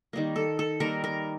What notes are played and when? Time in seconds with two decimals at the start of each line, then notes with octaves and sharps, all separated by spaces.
0.13 D#3 G3 A#3
0.36 A4
0.59 A4
0.80 D#3 G3 A#3 A#4
1.04 A#4